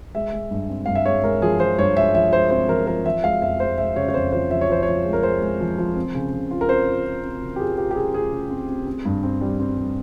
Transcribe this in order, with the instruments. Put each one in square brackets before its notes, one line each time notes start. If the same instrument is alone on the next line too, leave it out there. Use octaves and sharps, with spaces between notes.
[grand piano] G#3 E5
G#3
G2
C4
G2 F5
E5
G#3 C#5
G#3 A#4
F3 G#4
F3 C5
G2 C#5
G#3 E5
F3 E5
G#3 C5
C4 C5
F3 A#4
F3 A#4
F3 E5
G#3 F5
F2 E5
G#3 C5
G#3 E5
C#3 C#5
C#5
F2 C5
F3 C5
F3 E5
C#5
F3 C5
F3 C#5
G#3
A#4
G#3 C5
G#3
F3
F3
C4
C#3
C#3
F4
A#4
C4 C5
F4
F4
C4
C#3
G4
F4 G#4
F4 G4
G4
C#3 G#4
F4 G#4
C#3
C4
C4
C4
G2
C4
G3
C4
G3